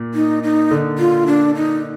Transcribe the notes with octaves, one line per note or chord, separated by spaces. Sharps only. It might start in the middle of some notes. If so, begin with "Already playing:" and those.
Already playing: A#2
D#4
D#4
D3
F4
D4
D#4